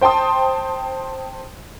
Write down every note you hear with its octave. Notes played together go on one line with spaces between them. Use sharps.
C5 G5 A5 C6 D#6